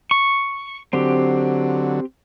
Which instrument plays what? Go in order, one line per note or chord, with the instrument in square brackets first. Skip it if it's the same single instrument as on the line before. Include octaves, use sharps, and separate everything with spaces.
[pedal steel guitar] C#6
[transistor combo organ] D3 F#3 [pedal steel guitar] C4 G4